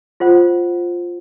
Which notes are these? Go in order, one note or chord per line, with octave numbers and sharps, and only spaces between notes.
F4 C5 F#5